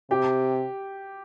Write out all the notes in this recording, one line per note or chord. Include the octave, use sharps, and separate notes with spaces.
C3 G4